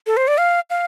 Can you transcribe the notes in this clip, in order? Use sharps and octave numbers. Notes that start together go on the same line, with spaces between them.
A4
C5
D5
F5
F5